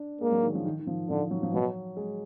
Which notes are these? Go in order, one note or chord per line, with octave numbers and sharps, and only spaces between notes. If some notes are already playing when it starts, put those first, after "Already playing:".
Already playing: D4
G#3 A#3
F#3
D#3
F3
D#3
D#3
F3
D3 F3
F#3
F3
B2 F#3
G#3